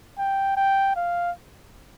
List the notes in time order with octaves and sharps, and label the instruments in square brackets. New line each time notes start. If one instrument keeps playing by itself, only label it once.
[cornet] G5
G5
F5